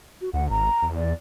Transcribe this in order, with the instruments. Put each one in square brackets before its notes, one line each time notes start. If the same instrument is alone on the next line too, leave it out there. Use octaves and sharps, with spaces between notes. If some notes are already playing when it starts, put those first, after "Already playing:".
[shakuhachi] F#4
[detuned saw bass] D2 [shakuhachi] F#5
[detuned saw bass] G#1 [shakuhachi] A#5
[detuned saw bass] E2
[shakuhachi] D5